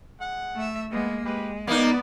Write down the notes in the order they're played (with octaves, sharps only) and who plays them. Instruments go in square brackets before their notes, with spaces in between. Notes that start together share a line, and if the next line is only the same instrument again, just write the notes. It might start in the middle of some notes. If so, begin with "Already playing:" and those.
[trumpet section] G#3 F#5
[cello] A3 E5
[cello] G#3 A#3 [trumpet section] B3
[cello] G#3 [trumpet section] G4 B4
[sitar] A#3 D#4 [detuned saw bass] B3 [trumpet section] D5